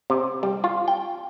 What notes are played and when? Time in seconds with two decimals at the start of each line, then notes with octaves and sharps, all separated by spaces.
0.10 C3
0.43 G3
0.64 F4
0.88 G5